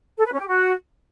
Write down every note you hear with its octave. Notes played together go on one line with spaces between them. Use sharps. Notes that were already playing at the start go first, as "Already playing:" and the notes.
A4
B4
C#4
G4
F#4